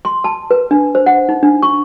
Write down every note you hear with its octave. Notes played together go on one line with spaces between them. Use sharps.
C6
A5
B4
D4
C5
F#5
D#4
D4
C#6